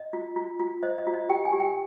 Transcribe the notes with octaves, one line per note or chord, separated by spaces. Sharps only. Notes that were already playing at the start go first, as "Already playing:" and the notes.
Already playing: D#5
F4
F4
F4
C5 D#5
D#5
F4
D#5
G4 G5
G#5
G4
G5